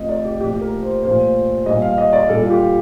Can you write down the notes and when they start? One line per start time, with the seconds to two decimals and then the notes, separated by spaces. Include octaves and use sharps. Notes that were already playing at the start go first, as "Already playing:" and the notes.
Already playing: C3 F3 A3 D#5
0.09 D5
0.25 G4
0.40 A#2 F3 A3 G4
0.61 A#4
0.83 C5
1.03 A#2 F3 A3 C5
1.66 A#2 G3 D#5
1.82 F5
1.98 D#5
2.13 D5
2.29 A#2 G3 A4
2.43 F4
2.50 G4